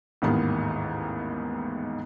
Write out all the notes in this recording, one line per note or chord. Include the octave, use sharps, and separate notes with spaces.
A1 D#2 G#2 D#3 B3